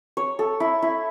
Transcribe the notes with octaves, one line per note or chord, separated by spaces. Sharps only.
C#5
A4
E4
E4